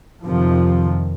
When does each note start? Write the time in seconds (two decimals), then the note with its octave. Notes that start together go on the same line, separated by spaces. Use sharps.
0.25 F2 C3 D#3 F3